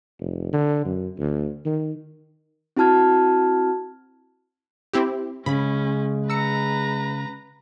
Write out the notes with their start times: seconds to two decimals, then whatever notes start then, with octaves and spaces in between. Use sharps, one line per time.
0.20 F1
0.53 D3
0.85 F#2
1.19 D2
1.65 D#3
2.77 C4 E4 F#4 A5 F6 G#6
4.93 C4 E4 G4
5.46 C#3 G#3 C#4 B5
6.30 B4 A#5 E6 C#7